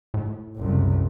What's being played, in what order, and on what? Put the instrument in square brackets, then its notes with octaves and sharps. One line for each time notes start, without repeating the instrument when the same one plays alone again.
[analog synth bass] A2
[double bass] F#1 C2